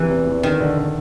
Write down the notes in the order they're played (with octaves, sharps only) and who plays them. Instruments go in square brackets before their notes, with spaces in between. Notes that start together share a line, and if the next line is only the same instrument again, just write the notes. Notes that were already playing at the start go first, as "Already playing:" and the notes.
Already playing: [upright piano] C3 [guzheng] E3
[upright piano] E2
E2
[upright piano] D3 [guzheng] D#3
[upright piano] D3
D3